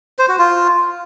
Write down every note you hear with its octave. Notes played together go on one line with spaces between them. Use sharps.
C5
F#4
F4